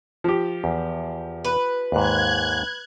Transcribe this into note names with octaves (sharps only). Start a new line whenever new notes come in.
F3 G4
E2
B4
D#2 G#2 F#6 G#6